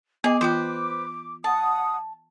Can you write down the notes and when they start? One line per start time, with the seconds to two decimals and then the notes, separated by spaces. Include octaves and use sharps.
0.24 B3 G#4 D#5 D6
0.41 E3 F4 B4 C5 G5
1.44 F#5 A5 D#6